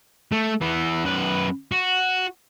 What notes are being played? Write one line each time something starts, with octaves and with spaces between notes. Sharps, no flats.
A3
E3 B3
F#2 B4
F#4